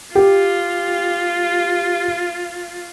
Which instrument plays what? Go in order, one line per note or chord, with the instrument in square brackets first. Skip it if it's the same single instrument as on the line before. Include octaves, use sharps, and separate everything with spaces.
[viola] F4 [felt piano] G4